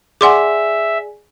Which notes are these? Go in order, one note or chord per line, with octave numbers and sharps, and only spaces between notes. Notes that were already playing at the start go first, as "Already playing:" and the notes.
G#4 D5 E5 F#5 G#5 C6 D6